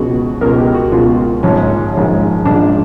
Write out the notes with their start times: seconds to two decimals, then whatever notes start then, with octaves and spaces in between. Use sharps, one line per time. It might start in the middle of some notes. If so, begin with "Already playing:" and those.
Already playing: C#2 B2 G#3 F#4
0.41 C#2 B2 G#3 A#4
0.58 G4
0.75 F#4
0.92 C#2 B2 G#3 F4
1.43 A#1 G#2 F3 G#3 C#4
1.94 A#1 G#2 F3 G#3 C#4
2.45 A#1 G#2 F3 G#3 D4